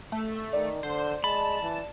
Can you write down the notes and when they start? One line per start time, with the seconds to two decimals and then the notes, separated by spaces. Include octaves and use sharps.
0.12 A3
0.53 D#3 D5
0.83 D3 C5
1.24 G#3 A5 B5
1.62 E3